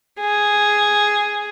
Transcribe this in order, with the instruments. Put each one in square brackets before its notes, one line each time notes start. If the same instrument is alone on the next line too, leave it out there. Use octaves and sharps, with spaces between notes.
[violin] G#4